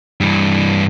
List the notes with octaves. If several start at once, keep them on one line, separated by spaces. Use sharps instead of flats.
G2 E3